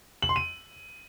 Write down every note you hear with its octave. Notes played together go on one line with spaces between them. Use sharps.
F#7
C6
D#7